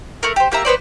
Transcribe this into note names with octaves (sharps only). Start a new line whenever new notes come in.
A3 A#4
G4 C5
A#3 G4 E5 A#5
B3 B4 C5 D5